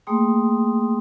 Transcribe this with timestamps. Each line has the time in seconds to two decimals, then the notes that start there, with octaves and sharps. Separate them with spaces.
0.07 A3 A#3 G#4 G5 C6 D#6